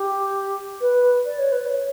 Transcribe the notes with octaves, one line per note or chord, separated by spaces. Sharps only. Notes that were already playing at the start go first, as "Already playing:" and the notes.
Already playing: G4
B4
D5
C#5
B4
D5
C#5